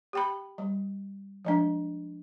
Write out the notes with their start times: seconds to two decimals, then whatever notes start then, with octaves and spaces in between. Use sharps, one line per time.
0.13 G4 G5 B5
0.58 G3
1.45 F3 G#3 D4